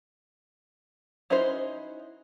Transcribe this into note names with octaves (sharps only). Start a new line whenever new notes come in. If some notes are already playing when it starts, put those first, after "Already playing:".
C#4 D#4 E4 F#4 C5